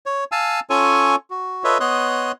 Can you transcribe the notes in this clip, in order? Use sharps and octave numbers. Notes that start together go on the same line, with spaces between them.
C#5
F5 G#5 A5 E6
C#4 F4 A4 C#5 G#5 C#6
F#4
F4 A4 B4 C#5 D#5 E5
B3 C#5 D#5 C6 D#6 F#6